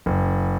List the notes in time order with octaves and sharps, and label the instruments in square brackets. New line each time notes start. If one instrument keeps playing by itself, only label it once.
[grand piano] F#1